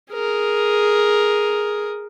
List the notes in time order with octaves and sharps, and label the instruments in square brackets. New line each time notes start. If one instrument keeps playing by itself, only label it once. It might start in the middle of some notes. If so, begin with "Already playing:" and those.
[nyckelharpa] G#4 A#4